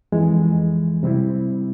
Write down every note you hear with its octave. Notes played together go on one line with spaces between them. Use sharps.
F2 E3 G#3
C3 G3 C4 E4